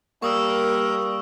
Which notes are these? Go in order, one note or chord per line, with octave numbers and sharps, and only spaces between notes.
G3 A#3 A#4 C#6 D#6 E6